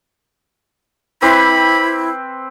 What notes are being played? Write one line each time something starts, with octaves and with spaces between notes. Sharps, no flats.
C4 E4 B4 B5 D6